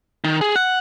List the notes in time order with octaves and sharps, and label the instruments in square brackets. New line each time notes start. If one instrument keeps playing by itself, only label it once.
[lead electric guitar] D#3
G#4
F#5